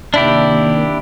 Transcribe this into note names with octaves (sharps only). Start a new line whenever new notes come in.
C3 D#3 A#3 D4 E4 G4